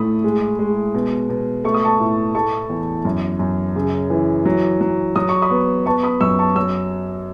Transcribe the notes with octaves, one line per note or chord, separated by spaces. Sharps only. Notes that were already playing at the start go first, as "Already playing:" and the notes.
Already playing: A2 A3 B5 D#6
G#3
G#3
B2
B2
A3 C#6
D#6
A5 C#6
A2
A3 A5 C#6
E2
F#2
F#2
C#3
E3
F#3
F#3
F#3 D#6
C#6
B5 D#6
B3
B3 A5 C#6
B5 D#6
F#2 C#6 E6
A5 C#6
F#3 E6